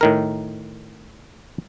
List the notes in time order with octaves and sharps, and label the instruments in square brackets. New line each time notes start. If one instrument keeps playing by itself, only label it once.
[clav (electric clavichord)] A2 D#3 A#4